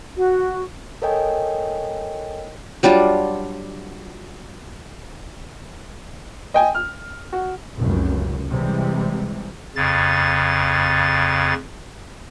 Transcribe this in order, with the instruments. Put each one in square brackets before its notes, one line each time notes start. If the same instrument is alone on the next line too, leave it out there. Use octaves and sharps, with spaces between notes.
[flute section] F#4
[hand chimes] A4 A#4 C#5 D#5 G5 G#5
[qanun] F#3 G3 D4 F4
[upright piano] D#5 G5 G#5
F6
F#4
[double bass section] F1 C#2 F#2
C3 E3 G3 G#3
[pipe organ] F2 C#3 A6